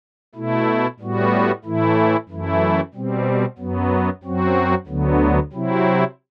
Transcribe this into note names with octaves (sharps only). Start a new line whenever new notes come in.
B2 A3 E4
A2 G3 B3 F#4
A2 E3 A3 E4
F#2 E3 A3 E4
B2 G3 C4
F#2 F#3 B3
F#2 F#3 C4 F#4
D2 D3 F#3 B3
C3 F#3 C4 E4